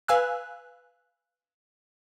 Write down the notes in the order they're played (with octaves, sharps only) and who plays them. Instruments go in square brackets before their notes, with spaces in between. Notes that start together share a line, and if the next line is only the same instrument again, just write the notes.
[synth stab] B4 F5 G#5 E6 F#6